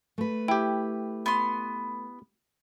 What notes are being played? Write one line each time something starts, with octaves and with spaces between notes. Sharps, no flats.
A3 B4
E4 G4 G5
B3 C6